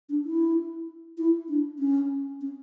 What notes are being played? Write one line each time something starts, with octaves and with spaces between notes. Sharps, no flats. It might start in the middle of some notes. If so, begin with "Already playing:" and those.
D4
E4
E4
D4
C#4
C#4